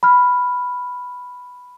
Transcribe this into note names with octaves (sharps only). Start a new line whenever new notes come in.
B5 F6